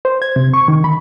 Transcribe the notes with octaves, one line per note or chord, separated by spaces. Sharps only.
C5
G#6
C3
C#6
D#3
B5